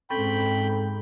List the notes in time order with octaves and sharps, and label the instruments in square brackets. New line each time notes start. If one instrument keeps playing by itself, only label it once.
[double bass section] G#2 [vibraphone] C4 C#4 A4 [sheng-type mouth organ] G5 B5